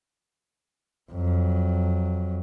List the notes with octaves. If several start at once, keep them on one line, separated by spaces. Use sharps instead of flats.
F2 F#3